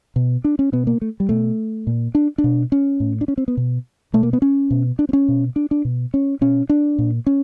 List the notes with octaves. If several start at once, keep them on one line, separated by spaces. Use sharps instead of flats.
B2
D4
C#4
B2 B3
A#3
A3
G3
B2 A3
A#2
D4
D4
B2
C#4
A2
D4
C#4
C4
B3
B2
B2 A3
A#3
B3
C#4
B2
D4
C4
C#4
B2
D4
D4
B2
C#4
B2 C#4
D4
A#2
C#4